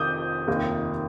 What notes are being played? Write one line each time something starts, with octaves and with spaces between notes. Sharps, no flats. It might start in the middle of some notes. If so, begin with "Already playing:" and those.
Already playing: F1 F2 D#3 D6 D#6 G6
F1 D#2 D#3 A#3